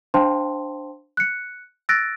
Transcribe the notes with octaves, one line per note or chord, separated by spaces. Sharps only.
D4 C5 F5 G5 A5 C6
F#6 C#7
E6 F#6 A6 A#6 D7